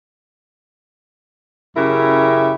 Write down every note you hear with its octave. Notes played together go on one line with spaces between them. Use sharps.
F#2 C#3 E4 G4 A#4 E5